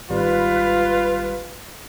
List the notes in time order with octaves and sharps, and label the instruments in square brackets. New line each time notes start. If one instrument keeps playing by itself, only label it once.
[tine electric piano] G#1 G3 [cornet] F4 [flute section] B4